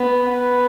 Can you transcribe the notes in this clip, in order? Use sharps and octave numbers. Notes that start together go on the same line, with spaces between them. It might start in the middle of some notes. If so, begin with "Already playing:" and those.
Already playing: B3
B3